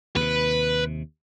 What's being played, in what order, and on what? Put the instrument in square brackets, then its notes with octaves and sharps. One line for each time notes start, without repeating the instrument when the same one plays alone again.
[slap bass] D#2 C3 [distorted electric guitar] B4